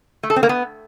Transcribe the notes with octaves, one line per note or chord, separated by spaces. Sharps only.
A3
A4
C4
A#3
B3